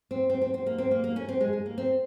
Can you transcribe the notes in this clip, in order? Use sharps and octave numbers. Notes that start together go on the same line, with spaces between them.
C4
C4
C4
C4
A#3
C4
A#3
A#3
C#4
C4
G#3
G#3
A#3
C4